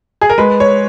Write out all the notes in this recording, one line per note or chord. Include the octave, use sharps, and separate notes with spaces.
G#4
A#4
G#3 B4
C#5